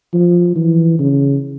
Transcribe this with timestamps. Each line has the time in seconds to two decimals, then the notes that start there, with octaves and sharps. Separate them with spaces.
0.13 F3
0.56 E3
0.99 C#3